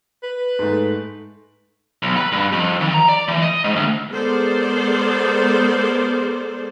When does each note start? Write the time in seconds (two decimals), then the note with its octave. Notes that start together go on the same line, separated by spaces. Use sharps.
0.23 B4
0.59 G#2 A3
2.03 B1
2.17 B4
2.32 G2
2.52 F2
2.81 D#3
2.94 A#5
3.09 D5
3.28 E3
3.42 D#5
3.64 G#2
3.76 D2
4.10 G#3 B3 A4 A#4 C5 D5